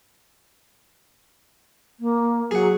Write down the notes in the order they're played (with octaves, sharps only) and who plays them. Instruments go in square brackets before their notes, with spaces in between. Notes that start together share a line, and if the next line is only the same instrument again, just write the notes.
[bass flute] A#3
[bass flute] F#3 [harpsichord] G#4 F#5